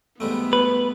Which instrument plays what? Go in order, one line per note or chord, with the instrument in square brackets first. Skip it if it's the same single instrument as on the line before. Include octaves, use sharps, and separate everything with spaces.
[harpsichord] G#2 G3 A3 [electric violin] B3
[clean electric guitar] B4